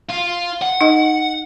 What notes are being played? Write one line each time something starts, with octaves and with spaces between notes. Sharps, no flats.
F4
F#5
D#4 D#5